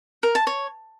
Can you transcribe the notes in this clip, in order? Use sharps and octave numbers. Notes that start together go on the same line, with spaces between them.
A#4
A5
C#5